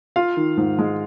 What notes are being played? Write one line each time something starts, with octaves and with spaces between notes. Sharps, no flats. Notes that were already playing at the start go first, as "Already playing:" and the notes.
F4 F5
D#3
G#2
G#3